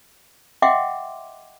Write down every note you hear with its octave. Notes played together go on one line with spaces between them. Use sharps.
D#5 E5 F#5 G5 C6 D6